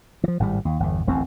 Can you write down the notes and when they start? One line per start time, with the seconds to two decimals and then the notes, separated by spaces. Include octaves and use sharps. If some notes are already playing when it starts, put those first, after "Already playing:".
0.24 E3 F3
0.40 G#1 A2 E3 G3
0.65 D#2
0.80 G1 E2
1.07 D1 A1 E2 C4